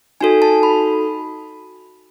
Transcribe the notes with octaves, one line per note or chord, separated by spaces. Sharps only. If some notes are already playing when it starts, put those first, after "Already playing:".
D#4 F#4 A4 G#5
A5
B5